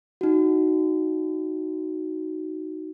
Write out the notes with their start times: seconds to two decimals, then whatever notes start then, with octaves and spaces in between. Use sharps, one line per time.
0.21 D#4 F#4